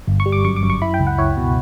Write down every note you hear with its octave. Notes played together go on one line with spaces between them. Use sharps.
G1
C#6
G3
D6
F#2 C#6
D6
F#2
C#6
E4 B5
G5
C#2
F#5
E4 C#5
B2